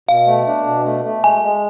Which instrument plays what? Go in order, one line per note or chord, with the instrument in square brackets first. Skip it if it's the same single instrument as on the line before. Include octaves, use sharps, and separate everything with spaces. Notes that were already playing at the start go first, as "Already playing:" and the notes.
[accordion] B2 [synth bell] F5
[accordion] A3
D4
B2
A3
A3
[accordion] G#3 [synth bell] G#5
[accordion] G#3